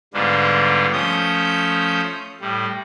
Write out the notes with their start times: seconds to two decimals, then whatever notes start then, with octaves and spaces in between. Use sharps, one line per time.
0.14 G#2 D3 G3 B3 D4 F4
0.93 F3 A3 C#4 D#6 G6
2.41 A2 G3